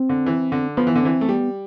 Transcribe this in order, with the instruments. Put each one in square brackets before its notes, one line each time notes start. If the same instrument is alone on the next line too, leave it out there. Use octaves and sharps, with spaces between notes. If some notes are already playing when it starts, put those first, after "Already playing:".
Already playing: [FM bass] C4
[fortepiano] D3
E3
D3
[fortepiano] F3 [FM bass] B3
[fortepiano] E3
D3
[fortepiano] E3 [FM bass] C4
[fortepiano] A3
[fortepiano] G3 [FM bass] B3